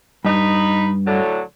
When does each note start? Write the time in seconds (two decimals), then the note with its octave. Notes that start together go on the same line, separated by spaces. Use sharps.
0.25 G2 D#4 B5
1.06 A2 D3 F#3